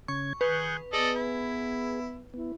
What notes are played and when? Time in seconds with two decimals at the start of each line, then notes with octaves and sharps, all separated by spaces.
0.08 C#3 C#4 C#6 G#6
0.41 D#3 G#4 B4 C#6 F#6 G6
0.93 B3 G#4 A4 D5 D#5
1.16 E4
2.34 B3 E4